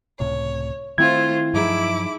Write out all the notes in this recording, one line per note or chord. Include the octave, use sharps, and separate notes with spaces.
C#2 A2 C3 C#5
D#3 A3 C4 E4 F4 C5 G#6
G2 F3 F#3 A3 D#4 E4 G#4 D6